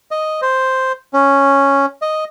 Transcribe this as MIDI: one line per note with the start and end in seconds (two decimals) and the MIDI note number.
0.11 0.41 75
0.42 0.92 72
1.13 1.86 61
2.02 2.24 75